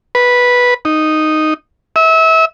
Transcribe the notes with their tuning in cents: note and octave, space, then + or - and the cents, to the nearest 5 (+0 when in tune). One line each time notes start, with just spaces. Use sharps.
B4 -10
D#4 -5
E5 -30